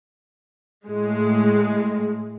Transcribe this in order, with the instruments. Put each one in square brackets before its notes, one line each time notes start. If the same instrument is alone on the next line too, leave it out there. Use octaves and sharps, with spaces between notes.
[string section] A2 G#3